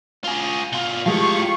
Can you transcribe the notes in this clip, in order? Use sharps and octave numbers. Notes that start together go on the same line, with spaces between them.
F4 G#4
B2 F4
A2 F3 G#3 F4 G4 F5 C#6